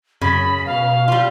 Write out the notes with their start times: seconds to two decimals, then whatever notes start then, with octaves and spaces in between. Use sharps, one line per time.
0.21 F#2 C#3 B5
0.66 B2 F5
1.08 G3 F4